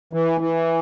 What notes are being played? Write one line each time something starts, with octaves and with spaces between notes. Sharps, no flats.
E3
E3